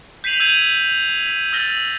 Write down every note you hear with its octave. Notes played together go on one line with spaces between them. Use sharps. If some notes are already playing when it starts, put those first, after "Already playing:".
G6 B6 C7 D#7 F7 F#7
E6 G6 G#6 D#7 F7
B6
E6 F6 A6 A#6 G7